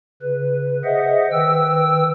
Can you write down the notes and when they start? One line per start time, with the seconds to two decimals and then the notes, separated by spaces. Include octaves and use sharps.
0.22 C#3 B4
0.84 G#4 C5 D#5 E5 F#5
1.32 D#3 B4 G5 E6